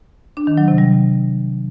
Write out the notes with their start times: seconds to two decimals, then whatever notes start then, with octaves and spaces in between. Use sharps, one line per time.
0.37 D4
0.47 D#3
0.58 F#3
0.68 C3
0.78 G3